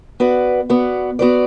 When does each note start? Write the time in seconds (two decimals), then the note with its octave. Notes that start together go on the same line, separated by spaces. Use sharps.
0.20 B3 F#4 B4 D5
0.69 B3 F#4 B4 D5
1.19 B3 F#4 B4 D5